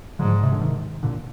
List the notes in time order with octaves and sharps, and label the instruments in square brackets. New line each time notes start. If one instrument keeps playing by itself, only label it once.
[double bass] G#2 [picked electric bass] D3 F3
[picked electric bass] C3
D3
C3 D#3
A#2 D3